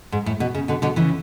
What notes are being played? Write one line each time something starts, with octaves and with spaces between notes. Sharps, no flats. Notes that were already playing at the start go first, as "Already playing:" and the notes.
G#2
A2
B2
C#3
B2 D3
B2 D3
C#3 E3